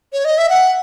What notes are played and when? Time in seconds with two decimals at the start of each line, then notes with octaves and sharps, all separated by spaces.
0.13 C#5
0.25 D#5
0.38 E5
0.50 F#5